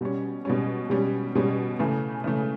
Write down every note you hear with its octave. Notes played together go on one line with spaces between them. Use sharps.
B2 G3 C#4
B2 G3 C#4
B2 G3 C#4
B2 G3 C#4
C#3 E3 A3
C#3 E3 A3